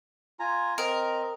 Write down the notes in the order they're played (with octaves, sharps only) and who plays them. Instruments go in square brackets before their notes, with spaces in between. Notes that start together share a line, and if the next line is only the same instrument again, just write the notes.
[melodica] F4 G#5 A#5
[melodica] C4 D#5 [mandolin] A#4